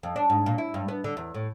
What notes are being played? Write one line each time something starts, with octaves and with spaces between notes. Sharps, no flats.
F2
D4
G#2
A#2
E4
G2
B3
D3
E2
A2